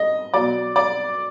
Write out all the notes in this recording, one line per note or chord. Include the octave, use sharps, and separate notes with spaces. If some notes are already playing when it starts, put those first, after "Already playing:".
Already playing: D#5
B2 F#3 D5
D5